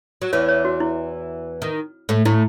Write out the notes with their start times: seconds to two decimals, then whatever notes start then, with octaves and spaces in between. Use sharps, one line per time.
0.22 F#3
0.33 E2 E3 C#5
0.49 C#5
0.65 F#4
0.80 E4
1.62 D#3
2.09 A2 A3
2.25 A2 A3 E4